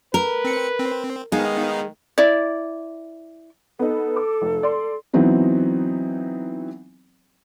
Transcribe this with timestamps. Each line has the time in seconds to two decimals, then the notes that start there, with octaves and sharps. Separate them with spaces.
0.14 A#4 B4
0.45 C4 C#7
0.79 C4
1.32 D#3 G#3 B3 D#4 F5
2.18 E4 D5
3.79 B3 D#4 A4
4.16 D6
4.42 F1
4.63 D5 C6
5.13 E3 F#3 B3 C4 D#4